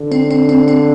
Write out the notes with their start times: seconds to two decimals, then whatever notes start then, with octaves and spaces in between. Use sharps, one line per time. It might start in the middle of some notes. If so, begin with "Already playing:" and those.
Already playing: D3
0.12 C4
0.31 C4
0.49 C4
0.68 C4